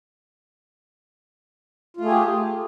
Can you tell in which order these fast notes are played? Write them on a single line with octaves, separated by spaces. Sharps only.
F4 A3 G#4 G4